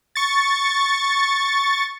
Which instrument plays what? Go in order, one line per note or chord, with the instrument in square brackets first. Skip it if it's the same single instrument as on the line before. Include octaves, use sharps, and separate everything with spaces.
[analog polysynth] C#6 A6